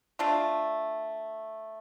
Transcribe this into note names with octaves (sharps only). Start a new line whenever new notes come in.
A3 D4 F4